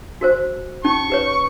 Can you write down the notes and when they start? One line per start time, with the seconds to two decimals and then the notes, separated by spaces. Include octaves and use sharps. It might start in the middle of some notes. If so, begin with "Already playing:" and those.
0.21 F#4 A#4 C5
0.85 C#4 D#4 C#6
1.10 G4 B4 C#5